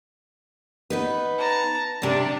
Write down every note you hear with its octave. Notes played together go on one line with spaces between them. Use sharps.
B3 D#4 B4
A5 A#5
C3 G3 D4